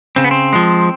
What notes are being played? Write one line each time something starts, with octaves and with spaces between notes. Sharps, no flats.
C#3 C4
B3
C4
F3 G#3